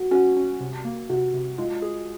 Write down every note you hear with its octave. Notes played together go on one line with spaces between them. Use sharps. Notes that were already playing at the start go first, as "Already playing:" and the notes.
Already playing: F#4
C#4 F#4
C#4
C3
A#3
C3 F#4
C3
G#3 F4
G#4